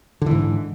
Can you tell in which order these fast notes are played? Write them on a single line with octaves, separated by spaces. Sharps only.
D3 E3 G#2